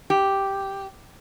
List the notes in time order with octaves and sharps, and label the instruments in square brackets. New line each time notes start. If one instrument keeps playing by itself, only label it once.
[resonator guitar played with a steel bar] G4